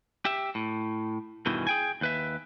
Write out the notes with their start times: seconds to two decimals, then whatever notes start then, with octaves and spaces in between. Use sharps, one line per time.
0.25 G4 E5
0.55 A2
1.46 E2 G2 B2 D#3 E3
1.67 G#4 G5 G#5
2.01 D#2 B4 E5